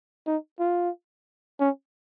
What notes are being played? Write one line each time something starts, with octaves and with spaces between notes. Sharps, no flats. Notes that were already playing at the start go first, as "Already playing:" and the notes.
D#4
F4
C#4